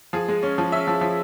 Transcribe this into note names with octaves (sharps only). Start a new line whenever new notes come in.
F3 G#4
G#3
C#4
F3
C#4 E5
F3
F3